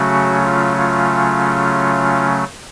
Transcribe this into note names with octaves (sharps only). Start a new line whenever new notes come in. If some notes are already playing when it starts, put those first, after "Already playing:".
Already playing: C#3 F#3 A3 C#4 F#4
F4
F4